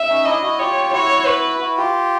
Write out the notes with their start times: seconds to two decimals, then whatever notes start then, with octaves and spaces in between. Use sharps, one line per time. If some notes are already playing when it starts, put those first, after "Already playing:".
Already playing: E5
0.09 C#4 D#4
0.25 D4 E4 D#5
0.42 E4 F#4
0.59 F4 G4 C#5
0.93 E4 F#4 C#5
1.27 B4
1.61 E4 F#4
1.78 F4 G4